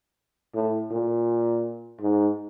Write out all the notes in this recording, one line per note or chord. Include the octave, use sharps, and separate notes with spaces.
A2
A#2
G#2